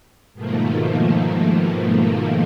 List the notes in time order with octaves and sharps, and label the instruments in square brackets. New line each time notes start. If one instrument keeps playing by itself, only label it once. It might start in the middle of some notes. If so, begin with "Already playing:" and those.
[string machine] G#2 B2 D#3 F3 A3 A#3